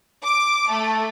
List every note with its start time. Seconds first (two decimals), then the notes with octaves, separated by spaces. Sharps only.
0.24 D6
0.70 A3